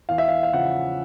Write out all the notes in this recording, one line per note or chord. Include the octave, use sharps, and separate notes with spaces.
E2 F5
E5
F5
F5
C#3 F3 F#5